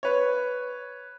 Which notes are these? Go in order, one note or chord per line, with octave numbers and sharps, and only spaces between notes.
B4 C#5